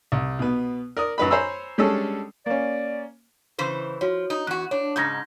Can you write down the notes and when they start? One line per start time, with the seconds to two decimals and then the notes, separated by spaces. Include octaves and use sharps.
0.12 C2
0.39 B2 B3
0.97 A#4 D5 D#6
1.18 F#2 F#3 F#4 B4 D#5 B5
1.30 C5 C#5 G#5 A#5 B5 E6
1.78 G3 G#3 C#4 D4 A4
2.46 A#3 C#4 D5
3.58 C#3 E3 C5
4.01 F3 F#4 C#5
4.30 D#4
4.47 E2 F#4 F#6
4.71 D4 C#5
4.96 G#2 C#3 D#4 G6 G#6 A#6